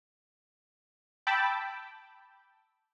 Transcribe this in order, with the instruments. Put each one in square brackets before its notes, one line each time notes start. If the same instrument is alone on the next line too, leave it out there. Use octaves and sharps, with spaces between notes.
[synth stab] G5 A5 B5 D6 E6